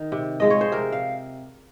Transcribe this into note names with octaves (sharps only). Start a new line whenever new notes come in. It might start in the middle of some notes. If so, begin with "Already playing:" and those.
Already playing: D#3
C3
F3 G#3 D#5
C#5
C5
C3 A#4
F5